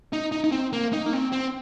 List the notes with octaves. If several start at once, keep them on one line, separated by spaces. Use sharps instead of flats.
D#4
D#4
D#4
C4
A#3
D#4
A#3
C4
C4